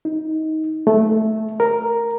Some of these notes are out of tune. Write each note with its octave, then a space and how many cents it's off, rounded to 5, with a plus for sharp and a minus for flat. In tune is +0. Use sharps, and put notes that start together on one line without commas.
D#4 +20
A3 -10
A#4 +0